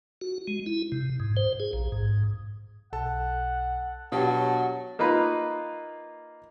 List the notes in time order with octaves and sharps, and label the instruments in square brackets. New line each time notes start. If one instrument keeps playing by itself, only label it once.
[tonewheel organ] F#4
G#3
E4
C3
G#2
C5
G#4
A#1
G#2
[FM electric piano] B1 [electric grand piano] A4 A5 [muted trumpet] F#5
[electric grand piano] B2 [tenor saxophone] F#3 [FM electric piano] D4 G4 C#5 [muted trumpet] A5
[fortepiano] A#3 D#4 F4 B4